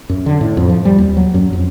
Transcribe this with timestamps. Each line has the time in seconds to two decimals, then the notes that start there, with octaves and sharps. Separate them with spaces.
0.09 F#2
0.26 D3
0.41 A2
0.57 F2
0.70 F3
0.85 G3
0.98 D#2
1.17 F#3
1.34 F#2
1.53 F2